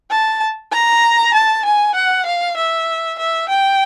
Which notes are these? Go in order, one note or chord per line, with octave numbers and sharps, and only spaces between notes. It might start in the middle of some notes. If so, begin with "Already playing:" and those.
A5
A#5
A5
G#5
F#5
F5
E5
E5
G5